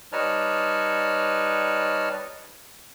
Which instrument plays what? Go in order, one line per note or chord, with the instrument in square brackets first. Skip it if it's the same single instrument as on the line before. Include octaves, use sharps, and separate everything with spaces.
[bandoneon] G3 D#4 B4 C#5 A5 F6